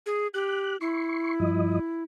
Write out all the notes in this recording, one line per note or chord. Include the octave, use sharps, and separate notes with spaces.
G#4
G4 F#6
E4 C6 C#6
G2 F3 D#5